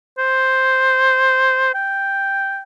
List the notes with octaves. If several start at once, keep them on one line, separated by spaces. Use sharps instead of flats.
C5
G5